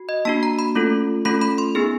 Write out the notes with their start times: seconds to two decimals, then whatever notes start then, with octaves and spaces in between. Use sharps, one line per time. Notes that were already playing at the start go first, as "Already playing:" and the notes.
Already playing: F#4
0.09 D#5
0.25 A#3 D4 F#4 A5
0.43 A#5
0.59 B5
0.75 A3 C#4 F4 A4
1.25 A3 C#4 F4 A4 B5
1.41 B5
1.58 C6
1.75 B3 D#4 G#4